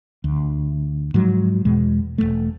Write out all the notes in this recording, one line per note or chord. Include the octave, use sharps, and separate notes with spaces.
D2
G#2 F3 F#3
E2 B2 G#3
E1 E2 A3